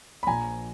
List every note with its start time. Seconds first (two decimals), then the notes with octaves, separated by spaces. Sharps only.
0.23 B5
0.27 A#1 A#2 F3 G#5 A#5